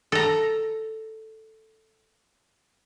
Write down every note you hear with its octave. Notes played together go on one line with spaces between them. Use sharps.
A4 A#5